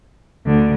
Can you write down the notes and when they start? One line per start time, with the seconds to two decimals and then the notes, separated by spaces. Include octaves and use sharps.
0.46 D2 D3